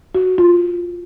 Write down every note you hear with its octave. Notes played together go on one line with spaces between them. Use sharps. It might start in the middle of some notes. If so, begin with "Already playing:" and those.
F#4
F4